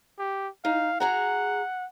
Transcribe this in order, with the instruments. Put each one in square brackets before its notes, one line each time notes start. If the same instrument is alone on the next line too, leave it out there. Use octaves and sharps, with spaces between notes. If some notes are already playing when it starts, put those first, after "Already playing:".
[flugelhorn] G4
[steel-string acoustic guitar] D#4 [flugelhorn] F5
[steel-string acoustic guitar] F#4 G#4 A#5 [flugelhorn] F#5